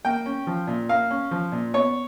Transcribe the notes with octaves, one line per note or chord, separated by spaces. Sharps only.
A#3 G5
C#4
F3
A#2
A#3 F5
C#4
F3
A#2
B3 C#5